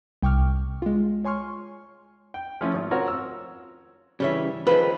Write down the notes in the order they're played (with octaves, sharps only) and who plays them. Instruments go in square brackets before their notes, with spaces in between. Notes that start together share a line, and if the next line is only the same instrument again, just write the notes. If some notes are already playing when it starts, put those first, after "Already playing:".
[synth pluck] C2 G5 C#6 D6 F6
G#3 F4
C#5 G#5 C6 C#6 F6
[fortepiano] G5
F3 A3 C#4 E4 F4
G#1
C4 F4 F#4 A#4 C#5
E6
[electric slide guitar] C#3 E3 [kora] G3 C#4 E5
[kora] D#3 F3 C4 [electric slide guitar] F4 G4 G#4 [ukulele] B4